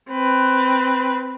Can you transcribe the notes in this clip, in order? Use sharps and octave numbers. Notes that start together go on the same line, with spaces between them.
C4 B4